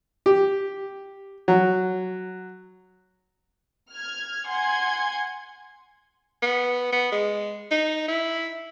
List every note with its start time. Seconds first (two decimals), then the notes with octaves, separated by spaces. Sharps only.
0.26 G4
1.48 F#3
3.91 F6 G#6
4.46 F#5 G#5 C6 G#6
6.42 B3
6.93 B3
7.12 G#3
7.72 D#4
8.08 E4